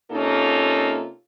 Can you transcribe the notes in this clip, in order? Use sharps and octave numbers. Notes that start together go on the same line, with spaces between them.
C3 A#3 C#4 D#4 F4 A4